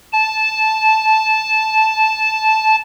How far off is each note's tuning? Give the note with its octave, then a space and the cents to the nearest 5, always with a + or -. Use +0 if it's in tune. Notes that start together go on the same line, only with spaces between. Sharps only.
A5 -10